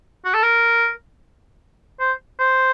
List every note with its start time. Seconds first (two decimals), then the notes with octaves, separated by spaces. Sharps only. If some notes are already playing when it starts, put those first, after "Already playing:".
0.25 F#4
0.34 A4
0.43 A#4
2.00 C5
2.39 C5